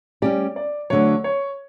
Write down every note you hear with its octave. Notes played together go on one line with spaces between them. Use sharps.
G3 C#4 G4 D5
D5
D2 D3 F#3 C#5
C#5